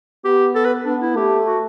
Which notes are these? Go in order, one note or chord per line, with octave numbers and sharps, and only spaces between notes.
B3 G4
A4
B4
B3 D4
E4
A3 G4
F#4